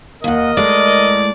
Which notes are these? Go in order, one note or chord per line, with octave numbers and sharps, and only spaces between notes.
D#2 A#4 D#5 F#5
A2 G#3 D5